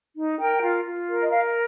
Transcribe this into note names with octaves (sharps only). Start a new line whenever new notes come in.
D#4
A#4 G5
F4
F4
A#4
D#5
A#4 F5